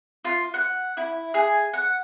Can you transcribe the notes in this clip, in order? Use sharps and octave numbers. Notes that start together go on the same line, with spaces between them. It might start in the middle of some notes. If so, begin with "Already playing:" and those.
F4
F#5
E4
G#4
F#5